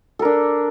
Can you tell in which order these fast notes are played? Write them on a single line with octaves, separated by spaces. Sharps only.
A4 A#4 D4